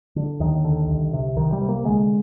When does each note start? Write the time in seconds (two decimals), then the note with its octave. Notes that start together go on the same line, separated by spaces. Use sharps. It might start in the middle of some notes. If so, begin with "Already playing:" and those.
0.16 D3
0.40 D#2 D#3
0.65 D3
0.88 C2
1.13 C3
1.36 C2 D#3
1.52 G3
1.61 C3
1.68 A#3
1.84 D3 G#3